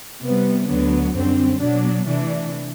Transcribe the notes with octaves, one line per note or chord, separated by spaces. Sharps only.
C3 G3 B3
D2 D3 F#3 B3
F#2 D3 G3 C4
B2 F#3 B3 D4
C3 E3 A3 D4